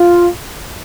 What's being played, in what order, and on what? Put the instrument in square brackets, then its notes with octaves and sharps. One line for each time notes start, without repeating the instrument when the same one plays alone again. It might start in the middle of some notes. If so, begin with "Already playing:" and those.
Already playing: [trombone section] F4